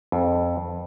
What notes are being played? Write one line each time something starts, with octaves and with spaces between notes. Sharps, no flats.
F2